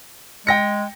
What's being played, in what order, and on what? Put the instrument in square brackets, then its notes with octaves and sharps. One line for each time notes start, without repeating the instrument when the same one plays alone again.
[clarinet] G#3 [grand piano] G5 A#6 C#7